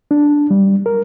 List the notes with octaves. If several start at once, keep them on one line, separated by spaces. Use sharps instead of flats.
D4
G3
A#4